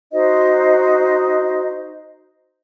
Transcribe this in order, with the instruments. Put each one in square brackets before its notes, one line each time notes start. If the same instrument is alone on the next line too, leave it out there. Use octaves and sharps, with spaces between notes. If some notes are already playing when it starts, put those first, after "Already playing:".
[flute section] D#4 F#4 C5 D#5